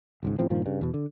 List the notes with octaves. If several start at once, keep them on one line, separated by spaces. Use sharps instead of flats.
G#1 C#2 G#2
A1 A2 F3 C4
G2 A#2 D#3 F3
G2 C#3
E2 B2
D3